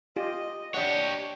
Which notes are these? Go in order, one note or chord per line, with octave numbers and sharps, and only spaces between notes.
F4 G4 D#5
D4 G4 C#5 D#5 F#5